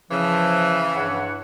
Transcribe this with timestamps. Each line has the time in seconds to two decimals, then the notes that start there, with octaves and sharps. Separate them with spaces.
0.11 C#3 E3 F3
0.96 G2 C#5 F#5